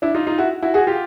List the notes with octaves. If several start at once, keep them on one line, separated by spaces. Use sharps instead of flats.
D4 E4
D#4 F4
D#4 F4
E4 F#4
E4 F#4
F#4 G#4
F4 G4